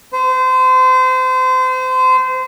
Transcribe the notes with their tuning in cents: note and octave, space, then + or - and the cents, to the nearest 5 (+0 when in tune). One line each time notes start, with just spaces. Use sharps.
C5 -30